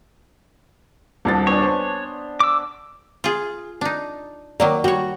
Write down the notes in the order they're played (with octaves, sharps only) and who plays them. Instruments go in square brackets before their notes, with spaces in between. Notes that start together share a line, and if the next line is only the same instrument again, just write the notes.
[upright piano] D#1 C2 A6 [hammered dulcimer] D4
[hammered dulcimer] B3 D4 G#5 [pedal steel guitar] C#5
[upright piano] C5
[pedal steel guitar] D6 E6
[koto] F4 G#4
D4 D#4
[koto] D#3 F#3 A#3 [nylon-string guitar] D5
[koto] G3 C#5 [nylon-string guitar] F#4